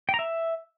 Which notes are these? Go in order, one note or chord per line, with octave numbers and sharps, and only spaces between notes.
G5
A#5
E5